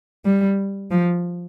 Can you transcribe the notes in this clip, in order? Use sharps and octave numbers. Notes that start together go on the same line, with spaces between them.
G3
F3